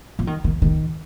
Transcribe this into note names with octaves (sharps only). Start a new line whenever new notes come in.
F3
D#3
D#3
D#3